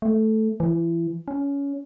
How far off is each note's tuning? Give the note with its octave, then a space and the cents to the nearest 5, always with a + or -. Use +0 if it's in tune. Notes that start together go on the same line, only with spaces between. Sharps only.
A3 -5
E3 +25
C#4 +20